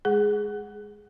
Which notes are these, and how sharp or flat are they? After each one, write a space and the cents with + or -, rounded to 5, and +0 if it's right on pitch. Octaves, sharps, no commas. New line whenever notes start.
G#3 +0 G#4 +0 F#5 +0